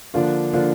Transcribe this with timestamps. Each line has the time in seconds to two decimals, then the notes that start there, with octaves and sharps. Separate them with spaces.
0.14 D3 F3 A#3 D4 F4
0.53 D3 F3 A#3 D4 F4